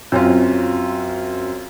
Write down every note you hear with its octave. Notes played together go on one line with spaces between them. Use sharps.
F#2 C4 C#4 F4